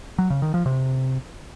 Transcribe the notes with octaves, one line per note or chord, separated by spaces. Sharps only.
F#3
C#3
D#3
F3
C3